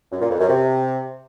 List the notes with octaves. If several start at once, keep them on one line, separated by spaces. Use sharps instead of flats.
F#2
A#2
F2
F#2
C3